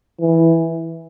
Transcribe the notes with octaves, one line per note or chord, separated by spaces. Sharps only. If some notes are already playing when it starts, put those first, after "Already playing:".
E3